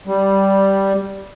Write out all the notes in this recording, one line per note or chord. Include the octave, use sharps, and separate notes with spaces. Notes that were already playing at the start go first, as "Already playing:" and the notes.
G3